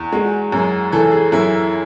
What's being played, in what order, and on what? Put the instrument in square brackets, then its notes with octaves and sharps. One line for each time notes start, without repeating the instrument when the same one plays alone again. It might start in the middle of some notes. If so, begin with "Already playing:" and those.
Already playing: [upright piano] E2
[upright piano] G#3 [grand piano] F#4
[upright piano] F#2 [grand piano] G#4
[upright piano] E3 [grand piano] A4
[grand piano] G#4
[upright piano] F#2 [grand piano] E4